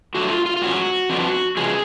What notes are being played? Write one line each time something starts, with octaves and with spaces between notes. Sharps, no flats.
D3 F#3 A3 D4 F#4
F4
F4
F4
G#2 F#3 C#4 F#4
F2 F3 B3 D4
C#3 F3 G#3 B3 G#4